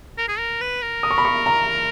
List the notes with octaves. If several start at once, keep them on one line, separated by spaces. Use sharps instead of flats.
A#4
G#4
A#4
B4
A#4
D#6
C#6
B5
C#6
A#5